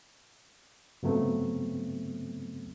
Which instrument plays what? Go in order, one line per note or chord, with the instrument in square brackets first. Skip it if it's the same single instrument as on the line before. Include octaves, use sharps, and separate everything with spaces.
[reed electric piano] G2 C#3 F#3 A3 B3 C4